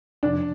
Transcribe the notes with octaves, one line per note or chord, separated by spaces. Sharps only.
F2 C3 F3 D4